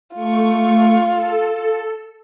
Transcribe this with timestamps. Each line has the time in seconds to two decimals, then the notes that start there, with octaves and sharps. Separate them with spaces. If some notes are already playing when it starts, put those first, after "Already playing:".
0.14 A3 F4 C#6
1.10 A4